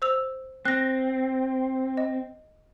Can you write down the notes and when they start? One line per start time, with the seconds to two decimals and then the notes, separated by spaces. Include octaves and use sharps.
0.02 C5 E6 F7
0.65 C4 F#6 A#6
1.97 D#5